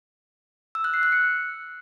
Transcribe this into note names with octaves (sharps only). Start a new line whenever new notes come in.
E6
F#6
C7
F#6
C#7